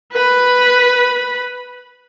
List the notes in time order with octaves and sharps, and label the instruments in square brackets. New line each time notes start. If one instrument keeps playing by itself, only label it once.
[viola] B4 B5